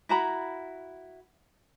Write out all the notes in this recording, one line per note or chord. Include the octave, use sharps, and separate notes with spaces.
E4 F#4 A#5 B5